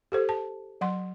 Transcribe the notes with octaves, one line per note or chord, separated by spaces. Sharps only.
G4 A4 C5
A5
F#3 F#5 C6